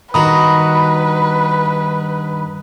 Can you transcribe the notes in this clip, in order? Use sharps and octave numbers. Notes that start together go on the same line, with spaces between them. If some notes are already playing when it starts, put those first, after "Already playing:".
G2 D#3 F#4 B4 A#5 B5 D#6